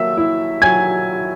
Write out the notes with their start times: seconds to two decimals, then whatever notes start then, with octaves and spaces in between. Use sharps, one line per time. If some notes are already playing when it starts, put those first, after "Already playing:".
Already playing: F#3 A#3 E5 E6
0.17 E4
0.61 F#3 G#5 G#6